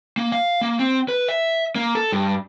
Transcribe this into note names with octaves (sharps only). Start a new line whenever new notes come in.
A#3
F5
A#3
C4
B4
E5
A#3
A4
G2